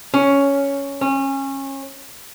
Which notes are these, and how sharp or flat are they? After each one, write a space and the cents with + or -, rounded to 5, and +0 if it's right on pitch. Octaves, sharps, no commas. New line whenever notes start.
C#4 +5
C#4 -25